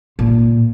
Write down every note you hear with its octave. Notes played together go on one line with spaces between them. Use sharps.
A#2